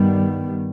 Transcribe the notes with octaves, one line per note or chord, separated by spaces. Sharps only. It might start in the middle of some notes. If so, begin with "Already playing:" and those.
Already playing: G2 D#3 G3 B3